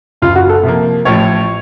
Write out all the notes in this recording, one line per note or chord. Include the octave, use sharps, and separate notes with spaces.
F#1 F#2 C#3 F4
F#4
A4
C3 F3 A#3
A1 A2 F3 C#5